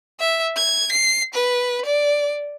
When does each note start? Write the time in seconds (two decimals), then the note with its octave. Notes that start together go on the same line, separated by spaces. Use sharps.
0.20 E5
0.56 G#6
0.92 C7
1.34 B4
1.85 D5